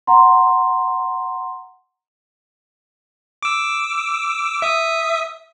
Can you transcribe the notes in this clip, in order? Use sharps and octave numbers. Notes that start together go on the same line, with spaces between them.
F#5 A#5 C6
D6 E6
E5 D#6